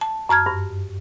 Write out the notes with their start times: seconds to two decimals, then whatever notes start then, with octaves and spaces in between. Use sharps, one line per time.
0.01 A5
0.29 F#2 A5 F6 G#6
0.46 G2